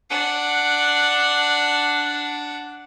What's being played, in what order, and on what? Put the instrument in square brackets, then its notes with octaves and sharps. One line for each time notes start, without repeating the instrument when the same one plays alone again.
[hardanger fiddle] D4 F#5